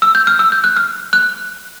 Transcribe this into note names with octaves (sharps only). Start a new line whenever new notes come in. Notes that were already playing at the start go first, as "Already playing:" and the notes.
E6
G6
F6
E6
G6
F#6
F6
F#6